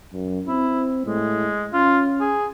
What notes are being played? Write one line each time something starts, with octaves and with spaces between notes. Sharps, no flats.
F#2
C4 E4
A2 G#3
C#4 F4
G#4